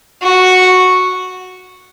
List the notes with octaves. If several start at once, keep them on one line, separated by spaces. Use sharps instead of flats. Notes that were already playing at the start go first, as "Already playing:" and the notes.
F#4